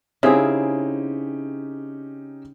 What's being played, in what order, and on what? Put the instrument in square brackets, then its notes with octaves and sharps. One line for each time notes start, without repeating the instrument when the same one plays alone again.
[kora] C#3 G#4 [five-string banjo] C4 E4 [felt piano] C#4 D#4 G4